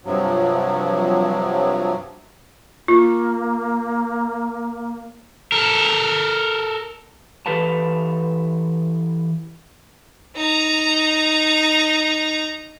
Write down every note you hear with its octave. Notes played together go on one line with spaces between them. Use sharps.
G2 C3 F3 F#3
A#3 F4
A4 A#4
E3 G4 A4 B4 F5 A5
D#4 A#5